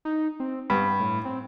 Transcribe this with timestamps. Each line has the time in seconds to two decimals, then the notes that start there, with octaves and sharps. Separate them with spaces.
0.05 D#4
0.40 C4
0.70 G2 B3 B5
1.00 A2
1.25 C4